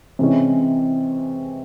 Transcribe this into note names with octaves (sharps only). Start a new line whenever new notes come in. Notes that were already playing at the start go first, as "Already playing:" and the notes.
C3 E3 G#3 C#4